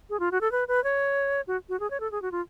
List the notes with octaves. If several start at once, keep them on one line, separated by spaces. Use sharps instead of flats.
G#4
F4
F#4
A4
B4
B4
C#5
F#4
F#4
G#4
C#5
A4
G#4
F#4
F4